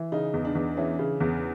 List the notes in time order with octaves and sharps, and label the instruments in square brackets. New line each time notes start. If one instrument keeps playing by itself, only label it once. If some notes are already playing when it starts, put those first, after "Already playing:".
Already playing: [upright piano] E3
[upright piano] C#3 [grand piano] D#4
[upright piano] E2
[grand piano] D4
[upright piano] E2
[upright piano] E3 [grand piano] C#4
[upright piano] C#3
E2